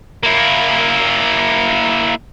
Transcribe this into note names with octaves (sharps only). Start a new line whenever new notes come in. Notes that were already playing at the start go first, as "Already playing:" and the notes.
A#3 E4